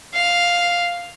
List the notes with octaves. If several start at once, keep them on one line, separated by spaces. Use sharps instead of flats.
F5